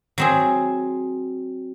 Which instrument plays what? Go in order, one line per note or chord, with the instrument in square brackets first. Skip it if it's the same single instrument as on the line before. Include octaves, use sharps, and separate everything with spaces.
[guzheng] F#3 C4 G#4